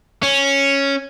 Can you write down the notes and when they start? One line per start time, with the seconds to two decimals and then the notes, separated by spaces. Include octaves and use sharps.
0.23 C#4